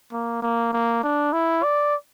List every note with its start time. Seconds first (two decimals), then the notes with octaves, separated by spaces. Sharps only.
0.12 A#3
0.42 A#3
0.73 A#3
1.03 D4
1.33 E4
1.63 D5